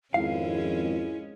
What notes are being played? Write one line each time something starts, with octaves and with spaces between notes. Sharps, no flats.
G#1 F2 G#3 C#4 E4 F5